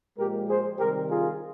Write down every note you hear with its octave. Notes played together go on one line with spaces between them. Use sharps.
A#2 F3 G#3 G4 A#4
G#4 C5
C3 D#3 G3 G4 A#4
F4 G#4